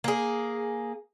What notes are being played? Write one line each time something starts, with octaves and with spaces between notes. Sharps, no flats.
A#3 G#4